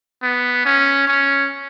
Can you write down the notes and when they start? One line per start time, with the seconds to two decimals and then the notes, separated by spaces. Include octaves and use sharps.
0.23 B3
0.65 C#4
1.07 C#4